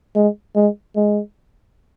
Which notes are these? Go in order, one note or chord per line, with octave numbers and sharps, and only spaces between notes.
G#3
G#3
G#3